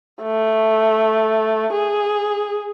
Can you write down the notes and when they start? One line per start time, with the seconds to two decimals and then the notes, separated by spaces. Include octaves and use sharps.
0.23 A3
1.73 G#4